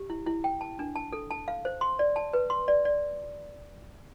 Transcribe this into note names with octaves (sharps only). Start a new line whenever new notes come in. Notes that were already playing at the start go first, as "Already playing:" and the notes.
Already playing: G4
E4
E4
G5
A5
D4
A5
A4
A5
F5
C5
C6
D5
A5
B4
C6
D5
D5